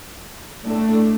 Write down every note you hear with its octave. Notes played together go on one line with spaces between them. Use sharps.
A2 A3 D4